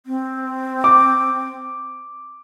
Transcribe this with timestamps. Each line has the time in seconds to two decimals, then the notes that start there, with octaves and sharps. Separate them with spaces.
0.06 C4
0.84 D6